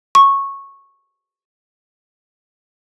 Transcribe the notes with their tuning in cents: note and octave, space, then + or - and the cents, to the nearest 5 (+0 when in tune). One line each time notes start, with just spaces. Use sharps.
C#6 -10